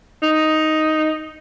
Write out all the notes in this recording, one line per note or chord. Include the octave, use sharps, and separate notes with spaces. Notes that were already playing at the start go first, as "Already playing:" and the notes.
D#4